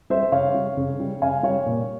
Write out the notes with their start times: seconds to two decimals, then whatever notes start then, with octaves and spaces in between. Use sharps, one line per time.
0.10 G3 C5 E5
0.32 C#3 C#5 F5
0.54 G3
0.77 C#3
1.00 G3
1.22 C#3 F5 G#5
1.43 G3 C#5 F5
1.66 A#2